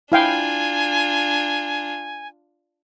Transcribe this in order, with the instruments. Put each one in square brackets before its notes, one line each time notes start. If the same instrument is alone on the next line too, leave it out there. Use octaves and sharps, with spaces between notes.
[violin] D4 F4 [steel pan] E4 F5 G5 [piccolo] G#5